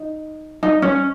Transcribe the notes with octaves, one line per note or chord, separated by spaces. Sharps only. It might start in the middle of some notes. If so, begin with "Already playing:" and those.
Already playing: D#4
D#4
C#4